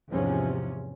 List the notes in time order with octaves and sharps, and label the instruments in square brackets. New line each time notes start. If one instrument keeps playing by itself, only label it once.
[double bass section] E2 G#2 C3 F3 C#4